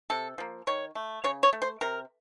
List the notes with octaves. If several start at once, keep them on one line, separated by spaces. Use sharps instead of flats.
C3 A4
F3 A#3
D#3 C#5
A3
C#3 C#5
C#5
A3
C5
C3 A#4